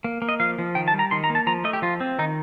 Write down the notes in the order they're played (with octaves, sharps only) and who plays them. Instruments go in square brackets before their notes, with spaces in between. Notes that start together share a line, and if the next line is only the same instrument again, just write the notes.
[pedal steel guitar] A#3
A#3
D#5
F3 F5
F3
D#3 G5
A5
G3
A#5
D#3 C6
A#5
A#3
A5
F3 A#5
A3 D#5
G4
F3 F4
C4
D#3 D#4